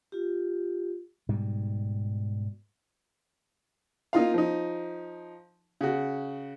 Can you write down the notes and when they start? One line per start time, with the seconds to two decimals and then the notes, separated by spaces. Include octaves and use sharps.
0.12 F4 G4
1.29 G#2 B2 G3
4.13 A#3 D#4 F4 F5
4.34 F3 D#4
5.81 C#3 F#4